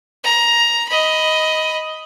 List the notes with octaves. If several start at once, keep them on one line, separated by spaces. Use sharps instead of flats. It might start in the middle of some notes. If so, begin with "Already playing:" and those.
A#5
D#5 B5